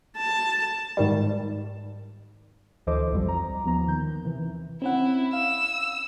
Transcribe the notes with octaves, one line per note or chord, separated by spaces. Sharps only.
A5
G#2 D#3 G3
D2 E3 A4 C5 D#5 D6
B1 F2 F3 G3
A#5
D#2 F3 B3 A#5
D#3 G6
C3 E3
C4 C#4 E4 F#5
F5 E6